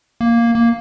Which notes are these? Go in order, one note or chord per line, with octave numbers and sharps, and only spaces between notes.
A#3
A#3